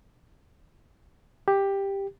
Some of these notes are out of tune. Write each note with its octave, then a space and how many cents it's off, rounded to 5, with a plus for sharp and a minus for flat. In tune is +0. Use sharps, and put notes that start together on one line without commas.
G4 +10